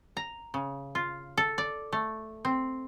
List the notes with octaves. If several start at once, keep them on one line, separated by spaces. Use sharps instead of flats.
A#5
C#3
F4
A4
D5
A3
C4